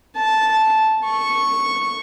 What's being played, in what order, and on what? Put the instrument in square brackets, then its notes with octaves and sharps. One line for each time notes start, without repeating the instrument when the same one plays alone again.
[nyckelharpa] A5
C#6